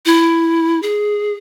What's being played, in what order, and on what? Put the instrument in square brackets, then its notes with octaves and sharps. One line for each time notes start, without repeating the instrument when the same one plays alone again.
[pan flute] E4
G#4